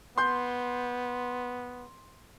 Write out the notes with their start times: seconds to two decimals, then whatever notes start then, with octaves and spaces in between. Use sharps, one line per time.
0.18 B3 C6 G6